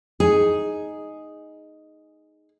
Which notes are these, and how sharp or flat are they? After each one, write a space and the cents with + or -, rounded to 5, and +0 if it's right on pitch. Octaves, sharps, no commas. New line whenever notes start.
D#4 +0 G#4 +0